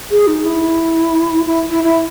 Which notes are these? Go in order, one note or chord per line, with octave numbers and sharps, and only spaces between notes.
G#4
D#4
E4
E4
E4
E4